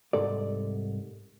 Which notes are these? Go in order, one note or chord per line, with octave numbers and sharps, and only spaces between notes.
C2 G#2 A4 D5